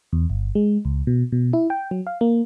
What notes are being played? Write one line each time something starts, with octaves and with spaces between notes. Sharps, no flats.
E2
G1
G#3
C#2
B2
B2
E4
G5
F#3
F5
A#3